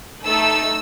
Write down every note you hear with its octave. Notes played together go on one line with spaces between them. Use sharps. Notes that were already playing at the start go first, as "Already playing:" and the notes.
A3 D#4 A4 E6